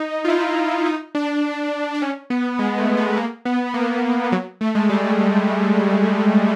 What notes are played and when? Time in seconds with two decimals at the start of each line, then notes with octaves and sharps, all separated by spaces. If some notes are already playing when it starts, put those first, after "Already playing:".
Already playing: D#4
0.25 F4
0.28 E4
0.86 D#4
1.15 D4
1.94 D4
2.02 C#4
2.30 B3
2.59 G#3
2.78 A3
2.97 B3
3.17 A#3
3.45 B3
3.74 A#3
4.32 F#3
4.61 A3
4.75 G#3
4.89 G3